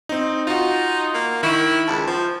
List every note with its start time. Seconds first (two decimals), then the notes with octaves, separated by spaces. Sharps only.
0.09 C4 D#4
0.47 D#4 F4 F#4
1.14 A#3
1.43 D#3 E4 C#6 D7
1.88 C#2 A5
2.07 F3